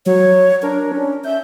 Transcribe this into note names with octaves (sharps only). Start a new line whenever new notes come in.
F#3 C#5
D4 A#4
C#4
E5 G6